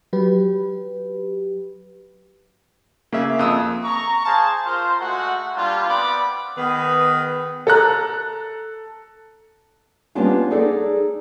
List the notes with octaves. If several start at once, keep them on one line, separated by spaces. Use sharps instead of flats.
F#3 G4 B4
C#3 A#3 E5
F2 D#6 E6
A#5 C#6
G#4 C5 F5 A5
F4 A#4 C5
G#3 A3 F#4 F#5
G3 A#3 D4 F4
B3 C4 D5 B5 D6
D#3 B3 G#4 B4
A4 A#5 F#6
G3 A#3 B3 C#4 D4 F4
D#4 G#4 A4 D5